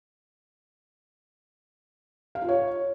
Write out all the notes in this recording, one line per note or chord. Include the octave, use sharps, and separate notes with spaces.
F5
F4
C#5